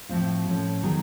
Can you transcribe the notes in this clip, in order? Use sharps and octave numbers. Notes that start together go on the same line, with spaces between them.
A2 F3 A3 C4 F4
A2 F3 A3 C#4
D#3 F#3 B3 D#4 G#4